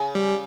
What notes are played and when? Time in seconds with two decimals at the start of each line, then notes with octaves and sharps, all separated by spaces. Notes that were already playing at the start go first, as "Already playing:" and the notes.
Already playing: C#3
0.15 G3